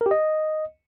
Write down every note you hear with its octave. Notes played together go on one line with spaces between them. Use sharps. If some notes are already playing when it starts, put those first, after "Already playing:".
A#4
G4
D#5